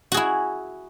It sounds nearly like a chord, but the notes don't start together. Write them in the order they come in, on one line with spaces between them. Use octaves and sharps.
F#4 G#4 E4